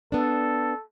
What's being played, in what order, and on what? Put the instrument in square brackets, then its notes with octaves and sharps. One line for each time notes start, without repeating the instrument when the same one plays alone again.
[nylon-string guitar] B3 D4 [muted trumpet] A4